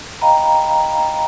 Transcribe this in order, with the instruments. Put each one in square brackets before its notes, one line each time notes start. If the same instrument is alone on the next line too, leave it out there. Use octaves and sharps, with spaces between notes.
[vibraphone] D#5 F5 G5 A#5 B5